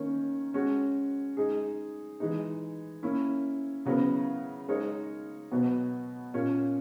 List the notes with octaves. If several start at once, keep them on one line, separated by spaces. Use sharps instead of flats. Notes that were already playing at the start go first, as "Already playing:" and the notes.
Already playing: D#3 A#3 C#4
G#3 C#4 F#4
G#3 D#4 G#4
E3 G#3 D#4
A#3 C#4 E4
C#3 F#3 B3 E4 A#4
G#3 D#4 A#4 C#5
B2 F#3 B3
A#2 A#3 C#4